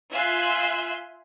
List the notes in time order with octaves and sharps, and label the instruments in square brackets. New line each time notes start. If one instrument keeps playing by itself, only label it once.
[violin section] F4 E5 G#5 C6 F#6 C7